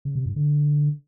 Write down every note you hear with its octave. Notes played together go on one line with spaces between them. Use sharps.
C#3
C3
G2
D3